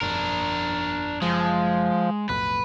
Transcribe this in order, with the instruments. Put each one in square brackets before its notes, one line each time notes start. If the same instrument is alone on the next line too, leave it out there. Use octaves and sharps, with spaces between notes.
[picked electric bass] G1 F2 [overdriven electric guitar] D4 A#4
[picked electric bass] F#1 [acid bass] F3 [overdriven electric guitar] G#3
[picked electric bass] B1 F2 A2 [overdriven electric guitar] B4